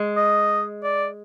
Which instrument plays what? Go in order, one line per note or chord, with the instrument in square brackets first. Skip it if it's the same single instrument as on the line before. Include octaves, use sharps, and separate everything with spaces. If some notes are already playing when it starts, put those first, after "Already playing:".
Already playing: [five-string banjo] G#3
[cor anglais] D#5
D5